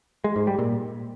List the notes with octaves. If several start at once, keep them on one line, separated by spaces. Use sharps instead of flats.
G#3
G#2
G3
A#2